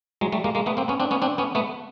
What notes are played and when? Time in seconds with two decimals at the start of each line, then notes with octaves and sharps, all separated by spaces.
0.21 F#3 G#3
0.32 G3 A3
0.44 G#3 A#3
0.55 G#3 A#3
0.66 A3 B3
0.77 A#3 C4
0.88 B3 C#4
1.00 C4 D4
1.11 B3 C#4
1.22 C4 D4
1.38 B3 C#4
1.55 A3 B3